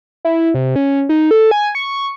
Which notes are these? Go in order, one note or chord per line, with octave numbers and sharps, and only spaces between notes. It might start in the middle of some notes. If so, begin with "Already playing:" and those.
E4
C3
C#4
D#4
A4
G#5
C#6